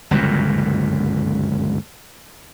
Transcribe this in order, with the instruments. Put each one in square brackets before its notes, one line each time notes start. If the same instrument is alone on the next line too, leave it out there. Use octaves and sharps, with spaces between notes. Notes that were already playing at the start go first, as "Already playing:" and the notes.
[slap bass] G1 C#2 F#2 A#2